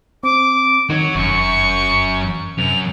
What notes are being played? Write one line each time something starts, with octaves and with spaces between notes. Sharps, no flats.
C4 D6
D#3 F#4 C#5
F1 F#2 C#6
F#2 C3 F7